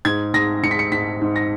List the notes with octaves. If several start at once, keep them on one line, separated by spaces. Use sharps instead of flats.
G#2 G#6
G#2 A#6
G#2 C#7
B6
C#7
G#2 B6
G#2
A#6